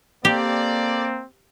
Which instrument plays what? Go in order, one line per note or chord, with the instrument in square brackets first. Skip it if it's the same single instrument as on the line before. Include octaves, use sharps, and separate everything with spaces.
[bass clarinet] A#3 [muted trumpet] C4 [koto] G4 [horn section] A4 D5